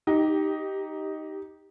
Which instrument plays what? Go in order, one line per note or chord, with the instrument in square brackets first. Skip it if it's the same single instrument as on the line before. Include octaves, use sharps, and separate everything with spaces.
[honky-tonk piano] D#4 G4